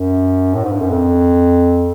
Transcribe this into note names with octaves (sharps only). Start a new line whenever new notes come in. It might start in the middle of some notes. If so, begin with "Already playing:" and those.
Already playing: F#2
A2
G#2
G2
F#2
F2